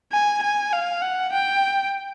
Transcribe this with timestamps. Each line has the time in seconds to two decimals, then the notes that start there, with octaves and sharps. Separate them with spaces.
0.12 G#5
0.43 G#5
0.73 F5
1.02 F#5
1.33 G5